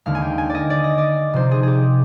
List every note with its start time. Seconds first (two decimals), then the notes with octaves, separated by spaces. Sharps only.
0.06 D#2 D3 G#3 F5
0.15 G#5
0.22 G5
0.38 G#5
0.50 D5
0.55 D#5
0.70 D5
0.84 D#5
0.98 D5
1.33 C3 F3 C4 D#4 C5
1.51 G#4
1.63 G4 G#4